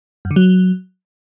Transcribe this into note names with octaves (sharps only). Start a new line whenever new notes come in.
F#2
D3
F#3